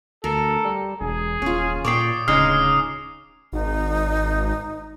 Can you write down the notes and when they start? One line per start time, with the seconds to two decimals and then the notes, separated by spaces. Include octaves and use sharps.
0.24 D2 A4 A#4
0.65 G3
1.01 E1 G#4
1.42 D#1 C#4 F4
1.85 A#2 C#5 D5 G5 D6 D#6 C7
2.28 D1 C#3 G#3 D#4 D#6 F6 C7
3.53 G#1 D#4